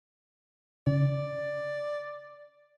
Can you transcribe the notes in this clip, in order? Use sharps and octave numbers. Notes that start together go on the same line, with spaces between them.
C#3 D5